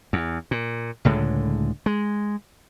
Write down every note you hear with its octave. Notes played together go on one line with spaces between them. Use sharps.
E2
A#2
C#2 A2 D3 G#3
G#3